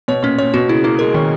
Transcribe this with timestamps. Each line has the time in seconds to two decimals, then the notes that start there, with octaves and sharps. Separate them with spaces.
0.08 B2 C#5
0.23 A#2 C#4
0.38 A#2 C#5
0.54 B2 F#4
0.69 C#3 E4
0.84 A#3 E4
0.99 G#3 A#4
1.14 D#3 C#4